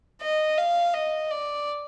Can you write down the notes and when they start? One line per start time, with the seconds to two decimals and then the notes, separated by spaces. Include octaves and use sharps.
0.21 D#5
0.58 F5
0.94 D#5
1.31 D5